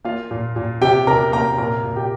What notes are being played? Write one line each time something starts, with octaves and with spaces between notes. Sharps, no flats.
A#3 F4 F5
A#2
A#2
C3 G4 G5
C3 A#4 A#5
A#3 A#4 A#5
A#2 A#4 A#5
A#2
G4 G5